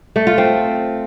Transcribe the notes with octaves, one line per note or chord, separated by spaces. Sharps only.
A3
F4
C4